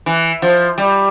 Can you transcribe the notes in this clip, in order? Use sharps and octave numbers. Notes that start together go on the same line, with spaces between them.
E3
F3
G3